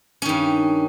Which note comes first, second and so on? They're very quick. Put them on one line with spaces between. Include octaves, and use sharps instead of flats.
C#4 D#3 G2